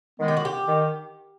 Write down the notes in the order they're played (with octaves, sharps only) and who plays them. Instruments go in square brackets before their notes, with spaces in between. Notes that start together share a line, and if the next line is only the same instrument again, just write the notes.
[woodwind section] D#3 G#3 B3
[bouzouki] G4
F#4
G4
[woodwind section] D#3